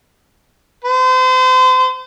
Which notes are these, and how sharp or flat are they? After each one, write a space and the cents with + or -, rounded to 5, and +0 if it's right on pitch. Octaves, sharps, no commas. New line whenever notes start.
C5 -35